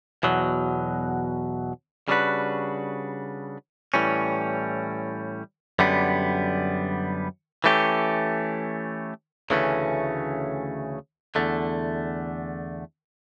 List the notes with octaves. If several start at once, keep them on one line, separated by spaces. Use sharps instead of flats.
E2 B2 F#3
C#3 G3 D4 F#4 B4
A2 E3 G3 C#4
F#2 D3 G3 B3
E3 A3 C#4 G4
D2 C#3 E3 A3 C#4
E2 D3 A3